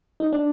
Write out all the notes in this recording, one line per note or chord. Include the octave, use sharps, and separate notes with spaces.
D#4
D4